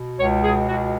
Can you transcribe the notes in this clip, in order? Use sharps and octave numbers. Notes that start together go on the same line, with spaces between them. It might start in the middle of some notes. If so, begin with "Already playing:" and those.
Already playing: B2
C#2 C#5
B2 G#4
C#2 F#4